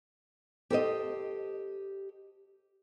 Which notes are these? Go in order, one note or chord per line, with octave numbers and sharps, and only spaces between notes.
G4 A4 C5 D#5